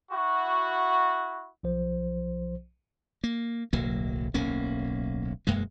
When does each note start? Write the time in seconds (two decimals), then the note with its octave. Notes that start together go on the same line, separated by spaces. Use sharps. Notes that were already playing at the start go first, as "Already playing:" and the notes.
0.12 E4 F#4
1.63 B1 F3 C5
3.24 A#3
3.73 D1 B1 F#3 A#3
4.34 D1 B1 A#3 C#4
5.47 E1 F#2 G#3 A#3